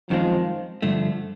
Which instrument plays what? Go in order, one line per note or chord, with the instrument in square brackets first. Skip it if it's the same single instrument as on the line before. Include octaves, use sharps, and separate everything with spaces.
[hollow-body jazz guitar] F#2 D#3 G#3 C4 [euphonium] F3
[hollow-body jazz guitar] G2 D3 F3 A3